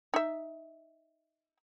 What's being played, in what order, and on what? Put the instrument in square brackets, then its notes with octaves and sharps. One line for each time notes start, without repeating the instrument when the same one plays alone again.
[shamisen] D#4 E5